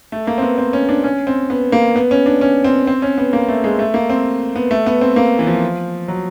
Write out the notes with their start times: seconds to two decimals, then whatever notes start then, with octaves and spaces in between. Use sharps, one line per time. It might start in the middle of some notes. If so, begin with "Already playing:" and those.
0.12 A3
0.27 A#3
0.38 C4
0.42 B3
0.58 C4
0.73 C#4
0.89 D4
1.04 C#4
1.27 C4
1.50 B3
1.72 A#3
1.96 B3
2.11 C#4
2.26 D4
2.41 C#4
2.64 C4
2.87 C4
3.02 C#4
3.18 B3
3.33 A#3
3.48 A3
3.64 G#3
3.79 A3
3.94 A#3
4.10 C4
4.56 B3
4.71 A3
4.86 B3
5.01 C4
5.16 A#3
5.39 E3
5.47 F3
6.08 F#3